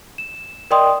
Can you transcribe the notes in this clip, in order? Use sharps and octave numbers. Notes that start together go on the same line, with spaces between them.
E7
A#4 D5 D#5 G5 C6 D#6